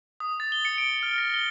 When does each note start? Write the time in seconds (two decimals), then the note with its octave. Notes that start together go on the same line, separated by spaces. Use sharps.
0.20 D#6
0.40 A6
0.52 G7
0.65 C#7
0.78 D7
1.03 F6
1.18 A#6
1.34 G7